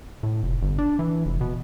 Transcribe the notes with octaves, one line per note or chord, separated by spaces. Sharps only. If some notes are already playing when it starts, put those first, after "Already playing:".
A2
F1
G1
D4
E3
F1
B2